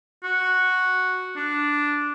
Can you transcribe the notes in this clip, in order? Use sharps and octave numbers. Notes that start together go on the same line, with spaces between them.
F#4
D4